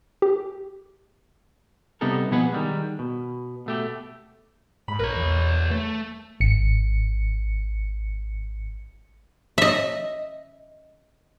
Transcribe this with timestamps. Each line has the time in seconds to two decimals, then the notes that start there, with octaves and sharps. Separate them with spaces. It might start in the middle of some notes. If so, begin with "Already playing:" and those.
0.22 G4
2.01 C3 G3 B3 D#4 A4 A#4
2.31 B2 F3 B3 G#4 B4 F#5
2.52 D#3 G3 G#3
2.99 B2
3.66 B2 A3 G4
4.88 G#2 B5
4.99 A#1 A#4 B4 C#5
5.15 E2
5.71 A3
6.40 G#1 C#7
9.58 D#5 E5